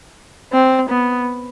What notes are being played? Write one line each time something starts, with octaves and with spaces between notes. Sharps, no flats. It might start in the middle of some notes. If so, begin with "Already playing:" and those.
C4
B3